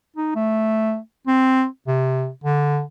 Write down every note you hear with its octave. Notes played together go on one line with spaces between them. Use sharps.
D#4
A3
C4
C3
D3